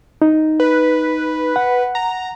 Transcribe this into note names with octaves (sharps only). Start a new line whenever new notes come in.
D#4
B4
F#5
A#5